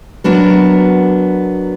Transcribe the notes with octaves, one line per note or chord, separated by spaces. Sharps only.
F#3 B3 D4 A#4